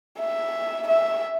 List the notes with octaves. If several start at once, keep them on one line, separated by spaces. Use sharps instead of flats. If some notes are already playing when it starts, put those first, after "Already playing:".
E5
E5